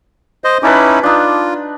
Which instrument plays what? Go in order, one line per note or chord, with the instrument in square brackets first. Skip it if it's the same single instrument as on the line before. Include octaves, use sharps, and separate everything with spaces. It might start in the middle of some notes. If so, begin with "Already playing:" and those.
[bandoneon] C5 D#5
[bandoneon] C#4 D#4 E4 [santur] B4 A5 D6
[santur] D4 D#4 [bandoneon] F4